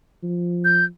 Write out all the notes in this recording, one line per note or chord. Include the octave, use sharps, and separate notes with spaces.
F3
G6